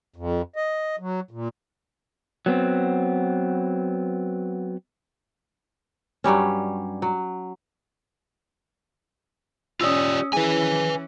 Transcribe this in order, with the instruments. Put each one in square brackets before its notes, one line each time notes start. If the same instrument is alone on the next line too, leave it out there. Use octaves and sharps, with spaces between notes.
[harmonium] F2
D#5
F#3
A#2
[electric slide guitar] F#3 B3 C4
[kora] G2 F#3 G3 C#4
F#3
[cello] C#4 [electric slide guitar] F4 G4 D5 [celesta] D#6 E6
[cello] E3 C#4 [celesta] E4 G#4 [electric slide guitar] B4 G#5